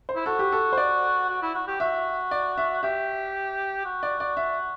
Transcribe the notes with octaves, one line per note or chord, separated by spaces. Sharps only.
C5
E4
F#4 A4
G4
A4
C5
D5
F#4
E4
F#4
G4
F#4 E5
D5
E5
G4 E5
F#4
D5
D5
E5